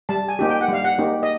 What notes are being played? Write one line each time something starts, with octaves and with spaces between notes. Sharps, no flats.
G3 A5
G#5
A#3 D#4 G4
G5
F#5
G3 F5
F#5
A#3 D#4 G4
D#5